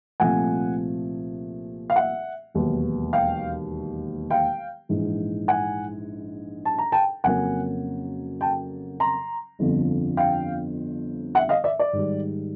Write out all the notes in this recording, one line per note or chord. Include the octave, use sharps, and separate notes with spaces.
C2 A#2 F3 A3 F#5 G#5
F5
E5 F#5
E1 D#2 D#3 F#3 B3
F5 G5
F5 G5
A#1 G#2 E3
F#5 G#5
A5
A#5
G5 A5
F2 C#3 F#3 A#3 C#4 F#5 G#5
G5 A5
A#5 C6
G1 F2 D3 F3
F5 G5
E5 F#5
D#5 F5
D5 E5
D5
G#2 D#3 G3